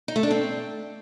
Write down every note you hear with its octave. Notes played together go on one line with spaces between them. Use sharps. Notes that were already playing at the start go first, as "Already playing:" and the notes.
D#4
A3
D4
C4